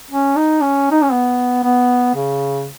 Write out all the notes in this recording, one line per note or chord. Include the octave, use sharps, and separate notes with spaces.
C#4
D#4
C#4
D#4
C#4
B3
B3
C#3